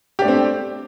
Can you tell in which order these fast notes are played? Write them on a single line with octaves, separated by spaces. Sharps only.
G4 D4 A3 C4